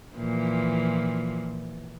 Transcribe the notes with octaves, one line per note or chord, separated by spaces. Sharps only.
A#2 E3 F3